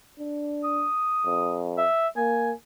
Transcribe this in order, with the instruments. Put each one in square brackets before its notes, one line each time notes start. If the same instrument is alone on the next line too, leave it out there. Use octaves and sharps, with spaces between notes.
[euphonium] D4
[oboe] D#6
[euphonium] F2
[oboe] E5
[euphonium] A#3 [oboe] G#5